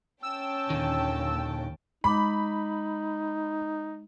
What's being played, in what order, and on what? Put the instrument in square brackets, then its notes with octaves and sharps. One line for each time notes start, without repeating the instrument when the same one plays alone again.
[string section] C#4 G5 A5 [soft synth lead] E6
[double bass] D#2 [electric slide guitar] A#2 D3 D#3
[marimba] G#3 D6 [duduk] D#4 [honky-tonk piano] B5